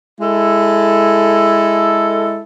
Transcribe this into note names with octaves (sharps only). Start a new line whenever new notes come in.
G#3 E4 A4